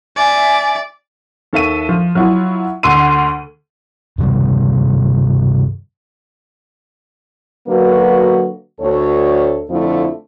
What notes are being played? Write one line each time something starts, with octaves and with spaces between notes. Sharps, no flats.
D5 E5 G#5
D#2 A4 E5 D#7
F3
F#3 E4 F4
D2 D3 C6 E6 D#7
G2 C3 D#3 G3
D3 F#3 A#3 F#4 B4
D2 A4 C#5
F2 D3 F3 A3 E4 F4